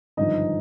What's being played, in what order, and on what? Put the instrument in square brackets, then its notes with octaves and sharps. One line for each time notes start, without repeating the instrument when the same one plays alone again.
[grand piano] G#1 G2 D3 F3 D#4 D#5